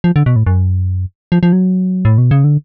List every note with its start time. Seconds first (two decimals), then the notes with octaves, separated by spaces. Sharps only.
0.04 F3
0.16 D3
0.26 B2
0.36 A2
0.47 F#2
1.32 F3
1.43 F3
1.53 F#3
2.05 A2
2.18 B2
2.31 C#3
2.44 D3